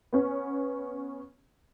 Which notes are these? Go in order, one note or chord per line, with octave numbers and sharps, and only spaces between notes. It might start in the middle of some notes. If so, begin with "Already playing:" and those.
B3 C#4